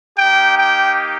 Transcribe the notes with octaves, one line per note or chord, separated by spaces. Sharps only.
A#3 D#4 G4 G5
G5